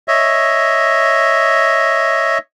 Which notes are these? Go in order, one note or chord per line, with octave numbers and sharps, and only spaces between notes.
C#5 D#5 E5